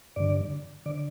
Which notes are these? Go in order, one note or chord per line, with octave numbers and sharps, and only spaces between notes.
G2 D3 D5
D3 D5